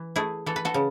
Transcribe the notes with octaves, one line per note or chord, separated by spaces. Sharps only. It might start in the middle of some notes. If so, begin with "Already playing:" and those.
Already playing: E3
A3 E4 G#4
E3 A4
B4
F#4 A4
C#3